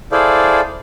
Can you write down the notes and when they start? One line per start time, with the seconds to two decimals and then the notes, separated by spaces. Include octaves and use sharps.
0.12 E4 G#4 A4 C5 D5 F5